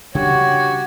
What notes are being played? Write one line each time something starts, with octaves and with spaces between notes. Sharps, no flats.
C#3 G3 D4 F#4 G4 C#5